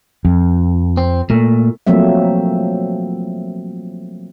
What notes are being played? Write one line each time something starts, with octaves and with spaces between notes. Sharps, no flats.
F2
C4
A#2 A3
F3 F#3 A3 A#3 C4 E5